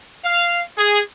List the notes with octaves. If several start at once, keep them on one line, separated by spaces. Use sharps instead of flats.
F5
G#4